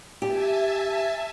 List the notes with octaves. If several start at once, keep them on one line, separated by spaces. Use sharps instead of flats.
G4 E5 G#5 A5